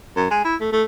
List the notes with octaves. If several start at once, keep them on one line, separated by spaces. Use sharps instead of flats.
F#2
G#3
E4
A3
A3